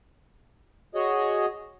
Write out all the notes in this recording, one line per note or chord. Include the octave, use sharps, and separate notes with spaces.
F#4 G#4 C#5 D#5